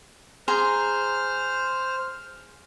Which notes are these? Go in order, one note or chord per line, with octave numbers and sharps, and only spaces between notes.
G#4 C5 A#5 C6 F6